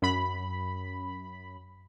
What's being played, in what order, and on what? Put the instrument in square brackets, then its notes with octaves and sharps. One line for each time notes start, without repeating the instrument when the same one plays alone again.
[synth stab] F#2 B5